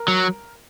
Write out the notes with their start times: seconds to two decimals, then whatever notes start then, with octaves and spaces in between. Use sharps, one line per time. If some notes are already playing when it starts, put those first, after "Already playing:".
Already playing: A#4
0.08 F#3